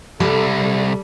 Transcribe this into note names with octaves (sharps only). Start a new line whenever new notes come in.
C2 G3 A4